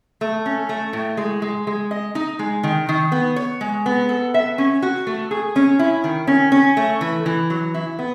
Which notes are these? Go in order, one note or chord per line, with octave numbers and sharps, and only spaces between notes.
A3
C#4
A3
A2
G#3
G#3
G#3
D#5
D#4
G#3
D#3
D#3
B3
C#5
G#3
B3
A4
E5
C#4
F#4
A3
G#4
C#4
E4
D#3
C#4
C#4
A3
E3
E3
F#3
E4
B3